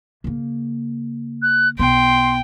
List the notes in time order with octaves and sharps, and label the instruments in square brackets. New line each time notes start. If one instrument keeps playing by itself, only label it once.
[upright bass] C#3 A#3
[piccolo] F#6
[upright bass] B1 B3 [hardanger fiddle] G5 [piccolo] C6